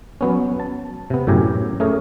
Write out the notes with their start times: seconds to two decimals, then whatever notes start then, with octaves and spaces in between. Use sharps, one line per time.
0.21 F#3 B3 C#4
0.60 A5
1.10 C3 B3
1.27 F#2 A2 G4 G#5 A#5
1.80 A3 C#4 G#4 A#4